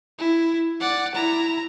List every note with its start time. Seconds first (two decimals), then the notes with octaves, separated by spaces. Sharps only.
0.18 E4
0.80 D5 F#5
1.15 E4 A#5